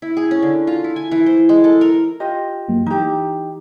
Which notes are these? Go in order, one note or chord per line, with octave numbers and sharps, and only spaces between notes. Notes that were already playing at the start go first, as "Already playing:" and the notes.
E4
G#4
C#4
D3
F4
E4
G#5
E3
C5
G#3
A4
A#4
F4 G4 D#5
G2 F#3 A#3
E3 D#4 G4